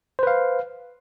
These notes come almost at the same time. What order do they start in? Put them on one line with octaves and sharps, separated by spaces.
C5 B4 F5